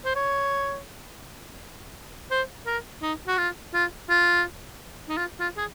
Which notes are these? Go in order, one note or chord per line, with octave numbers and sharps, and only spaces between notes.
C5
C#5
C5
A#4
D#4
F#4
F4
F4
F4
D#4
F4
F4
G#4